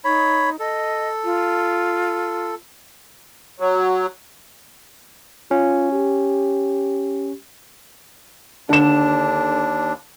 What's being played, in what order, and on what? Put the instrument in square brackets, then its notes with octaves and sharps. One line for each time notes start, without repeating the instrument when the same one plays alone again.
[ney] D#4 [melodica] C#5 B5
[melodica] A4 [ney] D#5
[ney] F4
[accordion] F#3
[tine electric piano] C#4 [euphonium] F4
[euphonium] G4
[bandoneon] D#2 D4 [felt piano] D3 E7